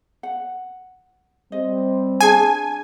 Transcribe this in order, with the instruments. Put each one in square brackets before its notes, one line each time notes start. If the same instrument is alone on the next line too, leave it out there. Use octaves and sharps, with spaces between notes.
[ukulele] F#5
[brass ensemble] G3 C4 [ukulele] D#5
[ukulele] D4 G#4 A5 [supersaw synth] G#5